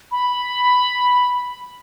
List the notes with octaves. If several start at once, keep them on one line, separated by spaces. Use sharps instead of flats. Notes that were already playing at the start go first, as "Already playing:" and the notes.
B5